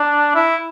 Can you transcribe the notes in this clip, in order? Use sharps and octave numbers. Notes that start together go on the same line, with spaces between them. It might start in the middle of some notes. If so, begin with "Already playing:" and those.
Already playing: D4
E4